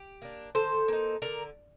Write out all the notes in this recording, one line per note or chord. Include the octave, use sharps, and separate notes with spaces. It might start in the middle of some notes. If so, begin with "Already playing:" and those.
Already playing: G4
A#3 D4
D#3 A4 C5
A#3 D#4
D3 A#4 D5